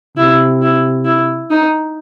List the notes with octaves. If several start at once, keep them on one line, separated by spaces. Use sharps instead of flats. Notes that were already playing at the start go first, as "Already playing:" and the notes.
C3 E4
E4
E4
D#4